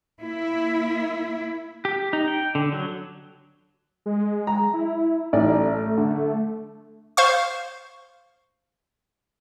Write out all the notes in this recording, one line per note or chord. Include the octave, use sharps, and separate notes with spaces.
A#3 E4
G4
D#4
G5
D3
F#3
G#3
A#5
E4
A1 A3 D#4 D5
D3
C5 F5 C#6